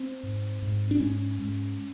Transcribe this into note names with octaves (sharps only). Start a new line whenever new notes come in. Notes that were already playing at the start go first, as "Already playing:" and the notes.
Already playing: C4
G#2
G#2
D4
G#2 C#4
G#2